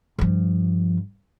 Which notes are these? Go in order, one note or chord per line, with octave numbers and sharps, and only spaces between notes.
G2 F3